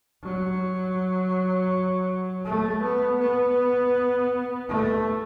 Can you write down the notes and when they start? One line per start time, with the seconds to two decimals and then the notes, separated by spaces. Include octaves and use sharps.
0.22 F#3
2.45 A3
2.82 B3
3.20 B3
4.69 A3